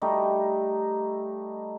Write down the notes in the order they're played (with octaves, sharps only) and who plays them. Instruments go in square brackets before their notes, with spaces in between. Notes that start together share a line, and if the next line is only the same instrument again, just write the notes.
[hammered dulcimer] G3 A3 D#4